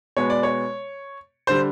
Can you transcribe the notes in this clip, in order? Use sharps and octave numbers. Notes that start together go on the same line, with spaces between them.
B2 G#3 B3 C#5
D5
C#5
D3 G3 C5